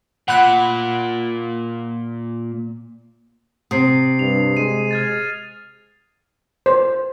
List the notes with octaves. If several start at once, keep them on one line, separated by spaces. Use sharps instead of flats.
A#2 F#5 B5 F#6
C3 D#6 C7
G2 F7
G#3 D#7
F6 G#6 A6
C5